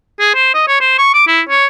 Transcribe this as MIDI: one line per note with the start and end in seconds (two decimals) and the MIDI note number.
0.19 0.31 68
0.35 0.53 72
0.54 0.64 75
0.67 0.79 73
0.81 0.96 72
0.98 1.11 85
1.14 1.25 86
1.27 1.42 64
1.49 1.67 73